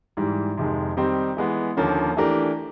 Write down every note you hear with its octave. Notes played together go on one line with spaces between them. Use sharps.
G#2 E3 G3
F2 C3 D#3 G#3
D#3 G3 C4 D#4 G4
E3 G#3 B3
D#2 D3 F3 A#3 C#4
E3 A3 D4 G4 A#4